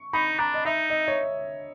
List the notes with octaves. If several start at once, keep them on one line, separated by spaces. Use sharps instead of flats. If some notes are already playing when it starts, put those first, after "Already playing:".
Already playing: C#6
D#4 B5
D4 A#5
D#5
D#4 E5
D#5
C#5